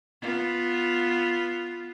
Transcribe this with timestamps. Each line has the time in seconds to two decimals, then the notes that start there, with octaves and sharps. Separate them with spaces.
0.22 B3 F4